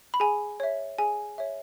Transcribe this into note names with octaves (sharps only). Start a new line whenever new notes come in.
B5
G#4 G#5
C#5 E5
G#4 G#5
C#5 E5